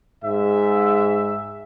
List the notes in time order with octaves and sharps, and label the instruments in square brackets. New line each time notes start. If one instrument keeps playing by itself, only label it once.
[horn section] G#2 E5